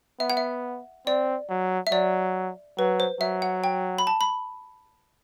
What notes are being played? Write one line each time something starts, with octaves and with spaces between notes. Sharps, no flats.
B3 E5
F#5
E5
C4 D5
F#3
E5
F#3 D5
F#3 B4
C5
F#3 E5
F#5
G5
B5
A5
B5